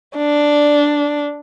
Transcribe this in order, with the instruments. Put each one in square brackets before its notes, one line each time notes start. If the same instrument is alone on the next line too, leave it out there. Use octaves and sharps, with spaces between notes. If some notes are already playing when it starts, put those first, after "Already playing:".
[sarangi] D4